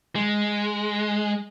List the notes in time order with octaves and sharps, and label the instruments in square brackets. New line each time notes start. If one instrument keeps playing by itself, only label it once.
[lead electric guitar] G#3